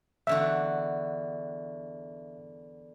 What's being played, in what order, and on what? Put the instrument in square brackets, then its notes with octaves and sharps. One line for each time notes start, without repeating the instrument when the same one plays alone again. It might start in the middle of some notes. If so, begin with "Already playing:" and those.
[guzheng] E2 D3 F#4 [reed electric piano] E5